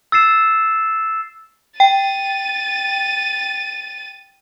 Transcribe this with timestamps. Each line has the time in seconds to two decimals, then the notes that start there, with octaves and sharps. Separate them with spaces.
0.12 E6 A6 C7 E7
1.80 G5 A6 D#7